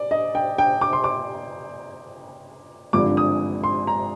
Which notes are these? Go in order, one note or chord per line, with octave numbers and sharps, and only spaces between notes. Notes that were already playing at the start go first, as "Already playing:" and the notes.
Already playing: D5
D#5
G5
G5
D6
C6
D6
G#1 G2 D3 F3 D6
D#6
C6
A#5